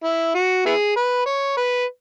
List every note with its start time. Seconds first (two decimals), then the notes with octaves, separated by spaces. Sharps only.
0.04 E4
0.35 F#4
0.65 B3 E4 G#4
0.96 B4
1.26 C#5
1.57 B4